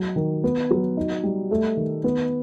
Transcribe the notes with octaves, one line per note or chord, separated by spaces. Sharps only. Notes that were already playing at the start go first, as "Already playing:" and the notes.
Already playing: F#3
D#3
B3
F#3
D#4
G3
A3
D#3
B3